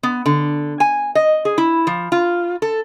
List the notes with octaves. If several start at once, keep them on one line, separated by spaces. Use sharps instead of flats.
B3
D3
G#5
D#5
G#4
E4
F3
F4
A4